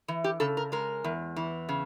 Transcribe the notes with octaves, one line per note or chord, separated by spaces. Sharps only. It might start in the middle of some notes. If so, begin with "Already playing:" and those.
E3
G4
C#3 A4
A#4
G#3 A#4
E2
E3
C#3